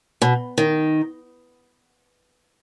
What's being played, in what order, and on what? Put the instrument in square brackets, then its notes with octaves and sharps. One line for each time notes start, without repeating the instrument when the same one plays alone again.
[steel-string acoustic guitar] B2
D#3